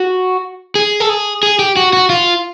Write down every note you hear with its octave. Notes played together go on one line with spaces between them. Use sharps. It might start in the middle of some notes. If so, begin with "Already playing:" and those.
Already playing: F#4
G#4
A4
G#4
G#4
G4
F#4
F#4
F4